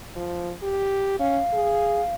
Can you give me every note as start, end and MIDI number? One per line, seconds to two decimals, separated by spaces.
0.16 0.53 53
0.63 1.17 67
1.19 1.40 61
1.19 2.15 77
1.53 2.02 68